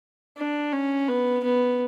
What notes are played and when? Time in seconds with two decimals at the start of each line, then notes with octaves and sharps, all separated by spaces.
0.38 D4
0.73 C#4
1.08 B3
1.44 B3